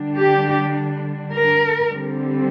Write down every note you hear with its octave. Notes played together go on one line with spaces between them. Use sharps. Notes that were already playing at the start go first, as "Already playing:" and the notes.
Already playing: D3 G3 D4
G4
A#4
D3 G3 C4